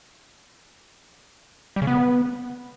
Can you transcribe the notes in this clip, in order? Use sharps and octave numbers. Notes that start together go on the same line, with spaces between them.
G3
C#3
B3